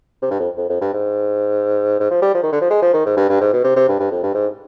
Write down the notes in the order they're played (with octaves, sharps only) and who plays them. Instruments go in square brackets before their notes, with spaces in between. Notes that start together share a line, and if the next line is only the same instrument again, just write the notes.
[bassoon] C3
G2
F2
F2
F2
G2
G#2
G#2
F3
G3
F3
D#3
D3
F3
G#3
F3
D#3
G#2
G2
G2
G#2
B2
C3
C3
G2
G2
F2
G2
G#2